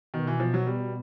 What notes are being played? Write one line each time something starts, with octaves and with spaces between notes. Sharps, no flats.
B2 D#3
E3
F3
F#3
G3